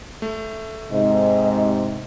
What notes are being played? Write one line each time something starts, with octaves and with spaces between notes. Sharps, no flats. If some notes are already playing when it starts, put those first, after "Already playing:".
A3
G#2 C3 D#5